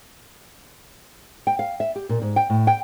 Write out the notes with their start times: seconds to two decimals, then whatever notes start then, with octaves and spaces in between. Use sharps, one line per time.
1.47 G5
1.59 F5
1.80 E5
1.96 G4
2.09 A#2
2.22 G#2
2.36 G5
2.50 A2
2.67 G5